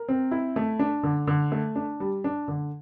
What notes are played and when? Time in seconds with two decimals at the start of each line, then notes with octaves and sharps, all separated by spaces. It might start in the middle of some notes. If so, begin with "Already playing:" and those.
Already playing: A#4
0.09 C4
0.31 E4
0.56 A3
0.79 D4
1.03 D3
1.27 D3
1.52 A3
1.76 D4
2.00 G3
2.24 D4
2.48 D3